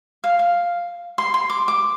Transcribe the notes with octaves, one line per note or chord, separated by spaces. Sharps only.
F5
F5
C6
C6
D6
D6